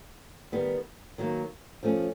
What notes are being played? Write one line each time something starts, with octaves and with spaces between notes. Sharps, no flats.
D#3 G3 B3
D#3 F#3 A#3
F3 A3 C#4